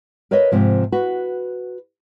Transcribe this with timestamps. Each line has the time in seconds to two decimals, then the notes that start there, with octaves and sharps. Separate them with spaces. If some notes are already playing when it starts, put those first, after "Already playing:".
0.31 A#4 B4 C#5 D#5 E5
0.52 G#2 C3 F3
0.92 F#4 B4